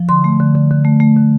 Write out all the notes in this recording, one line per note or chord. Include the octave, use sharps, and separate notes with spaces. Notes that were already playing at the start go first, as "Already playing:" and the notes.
Already playing: F3
D3 C6
A3
D3
D3
D3
A3
A3
D3